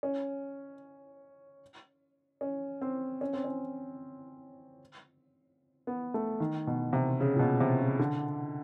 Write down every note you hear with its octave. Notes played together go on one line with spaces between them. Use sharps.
C#4
C#4
C4
C#4
C4
C#4
B3
A3
D#3
B2
C3
C#3
A#2
B2
C3
C#3
D3